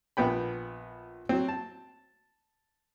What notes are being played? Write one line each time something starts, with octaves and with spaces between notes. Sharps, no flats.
A#1 B3 G5 B5
F#3 C4
A5